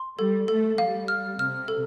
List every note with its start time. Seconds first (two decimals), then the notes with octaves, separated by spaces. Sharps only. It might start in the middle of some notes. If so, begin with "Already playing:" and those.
Already playing: C6
0.18 G3 A4
0.48 A3 A4
0.78 G3 F5
1.08 F6
1.39 C3 F6
1.68 A4